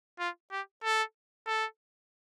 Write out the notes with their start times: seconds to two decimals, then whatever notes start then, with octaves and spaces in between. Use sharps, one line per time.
0.19 F4
0.51 G4
0.84 A4
1.46 A4